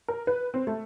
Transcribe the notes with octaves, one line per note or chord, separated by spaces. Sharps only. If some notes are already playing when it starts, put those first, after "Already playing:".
A#4
B4
C4
A3